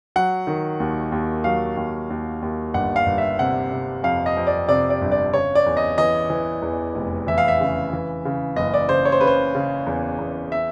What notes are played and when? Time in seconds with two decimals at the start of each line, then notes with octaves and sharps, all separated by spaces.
0.16 F#3 F#5
0.47 D#3
0.80 D#2
1.12 D#2
1.44 F#3 F5
1.77 D#2
2.10 D#2
2.42 D#2
2.74 G1 F#5
2.96 F5
3.06 G1
3.18 E5
3.39 C3 F#5
3.72 C3
4.03 F2 F5
4.26 D#5
4.37 F2
4.47 D5
4.68 C3 D5
4.90 D5
5.01 G1
5.12 D5
5.33 C#3 C#5
5.55 D5
5.66 E2
5.77 D#5
5.98 E3 D#5
6.30 E3
6.62 E2
6.95 F1
7.27 E3 E5
7.38 F5
7.48 E5
7.60 C#3
7.93 E3
8.25 C#3
8.56 F#1 D#5
8.74 D5
8.89 C#3 C5
9.05 C#5
9.12 C5
9.20 C#3 B4
9.27 C5
9.55 C#3
9.86 E2
10.19 E2
10.52 E5